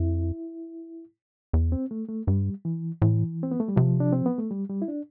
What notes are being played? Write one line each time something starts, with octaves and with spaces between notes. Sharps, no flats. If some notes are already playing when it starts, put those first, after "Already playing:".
Already playing: F2 E4
E2
C4
A3
A3
G2 G3
E3
A2 E3
C4
B3
A3
G3
C3 F3
D4
C4
B3
A3
G3
G3
E4
D4